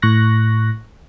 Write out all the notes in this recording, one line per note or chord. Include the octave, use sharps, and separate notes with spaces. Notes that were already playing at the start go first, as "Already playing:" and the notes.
A2 C#6 F#6 A#6